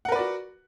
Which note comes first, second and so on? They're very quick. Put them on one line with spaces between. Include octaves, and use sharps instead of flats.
F#5 A#4 B4 D5 F#4